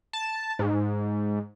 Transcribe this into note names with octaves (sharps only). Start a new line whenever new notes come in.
A5
G#2